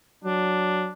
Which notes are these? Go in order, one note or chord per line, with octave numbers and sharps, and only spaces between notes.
F#3 D4